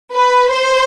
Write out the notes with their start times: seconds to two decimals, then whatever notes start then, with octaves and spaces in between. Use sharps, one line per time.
0.15 B4
0.51 C5